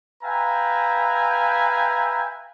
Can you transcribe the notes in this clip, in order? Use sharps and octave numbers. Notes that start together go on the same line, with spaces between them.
B4 E5 F5 G5 G#5 A#5